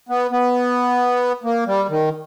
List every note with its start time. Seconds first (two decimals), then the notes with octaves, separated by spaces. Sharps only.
0.09 B3
0.31 B3
1.44 A#3
1.67 G3
1.89 D#3